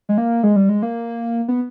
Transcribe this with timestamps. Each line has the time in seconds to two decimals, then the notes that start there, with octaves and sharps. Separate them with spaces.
0.09 G#3
0.18 A#3
0.43 G#3
0.56 G3
0.69 G#3
0.83 A#3
1.48 B3